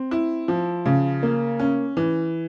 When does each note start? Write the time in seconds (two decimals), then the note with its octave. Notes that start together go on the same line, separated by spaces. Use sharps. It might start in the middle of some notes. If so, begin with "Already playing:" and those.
Already playing: C4
0.11 E4
0.48 F3
0.86 C#3
1.23 A#3
1.59 C#4
1.97 E3